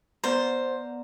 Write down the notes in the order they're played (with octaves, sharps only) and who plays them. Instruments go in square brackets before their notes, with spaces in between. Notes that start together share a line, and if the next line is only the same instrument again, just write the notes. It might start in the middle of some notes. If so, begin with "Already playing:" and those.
[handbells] B3 D5 A#5 [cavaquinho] C5